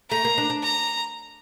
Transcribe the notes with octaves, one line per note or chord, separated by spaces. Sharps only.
A3 A#5
A#3
D4
D4
A#5